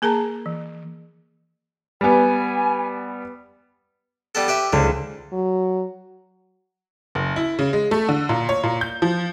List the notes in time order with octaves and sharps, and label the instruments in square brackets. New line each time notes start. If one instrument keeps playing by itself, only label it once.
[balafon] A#3 G#4 A#4 A5 A#5
E3
[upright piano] G3 B3 [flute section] G#5
[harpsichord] G3 B3 A4
G4 B4 E5
[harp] C#2 [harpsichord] D3
[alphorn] F#3
[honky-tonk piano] F#1
E4
C#3
G#3
A3
D3
A#2
C#5
A#2
G6
F3